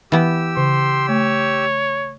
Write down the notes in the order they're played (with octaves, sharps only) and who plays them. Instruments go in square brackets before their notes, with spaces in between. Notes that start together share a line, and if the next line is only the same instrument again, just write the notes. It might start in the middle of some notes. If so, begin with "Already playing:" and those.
[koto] E3 B3 [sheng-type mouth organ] G4 E6
[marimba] C#3 [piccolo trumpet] C6
[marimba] A3 [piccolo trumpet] C#5